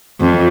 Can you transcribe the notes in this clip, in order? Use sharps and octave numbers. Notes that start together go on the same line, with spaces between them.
F2